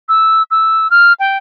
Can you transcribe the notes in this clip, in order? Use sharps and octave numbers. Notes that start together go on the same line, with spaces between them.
E6
E6
F6
G5